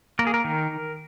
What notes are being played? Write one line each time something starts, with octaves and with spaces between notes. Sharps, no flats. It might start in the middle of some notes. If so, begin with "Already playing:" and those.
A#3 A#4
G#4
A#4
D#3